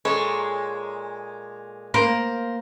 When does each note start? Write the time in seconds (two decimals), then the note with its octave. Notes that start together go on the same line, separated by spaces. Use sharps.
0.05 A#2 G#3 A4 C#5
1.94 A#3 A#4 C5